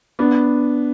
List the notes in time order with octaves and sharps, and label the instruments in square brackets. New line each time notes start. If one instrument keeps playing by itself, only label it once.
[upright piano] B3 D4